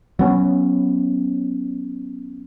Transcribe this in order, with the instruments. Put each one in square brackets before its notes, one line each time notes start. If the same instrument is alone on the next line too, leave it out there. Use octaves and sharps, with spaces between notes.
[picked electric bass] F#3 B3 C#4